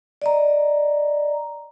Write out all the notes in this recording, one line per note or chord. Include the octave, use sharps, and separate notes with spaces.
D5 D#5 A#5